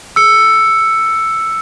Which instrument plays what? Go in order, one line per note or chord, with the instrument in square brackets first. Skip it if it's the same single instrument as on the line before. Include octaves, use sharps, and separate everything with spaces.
[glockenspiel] E6 C#7